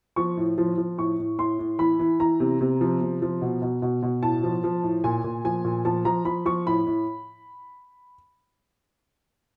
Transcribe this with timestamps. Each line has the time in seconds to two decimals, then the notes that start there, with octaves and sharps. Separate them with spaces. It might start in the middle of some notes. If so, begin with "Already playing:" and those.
0.16 F3 C#6
0.37 A2
0.58 F3
0.78 F3
0.98 A2 C#6
1.19 A2
1.39 A2 C6
1.59 A2
1.79 E3 B5
1.99 E3
2.20 E3 A#5
2.40 C3
2.61 C3
2.81 F3
3.01 C3
3.22 F3
3.42 B2
3.62 B2
3.82 B2
4.03 B2
4.22 A2 A5
4.43 F3
4.64 F3
4.83 A2
5.04 A#2 G#5
5.24 A#2
5.45 F3 G#5
5.65 A#2
5.85 F3 A5
6.05 F3 A#5
6.25 F3 B5
6.45 F3 C#6
6.66 A2 B5
6.87 A2